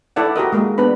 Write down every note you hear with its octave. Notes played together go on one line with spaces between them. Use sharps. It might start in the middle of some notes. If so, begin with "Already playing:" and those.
E4 A4 D5 F#5
F#4 G4 A#4 D#5
G#3 A#3 A#4
B3 D4 B4 B5